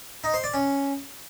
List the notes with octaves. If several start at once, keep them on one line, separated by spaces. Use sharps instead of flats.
D#4
C5
D5
C#4